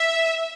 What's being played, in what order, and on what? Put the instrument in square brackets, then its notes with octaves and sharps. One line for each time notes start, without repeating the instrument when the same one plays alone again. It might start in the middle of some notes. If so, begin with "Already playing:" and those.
Already playing: [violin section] E5